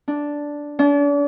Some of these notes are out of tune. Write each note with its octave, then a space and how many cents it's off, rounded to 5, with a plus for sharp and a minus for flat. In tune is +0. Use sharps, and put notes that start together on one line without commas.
D4 -5
D4 -40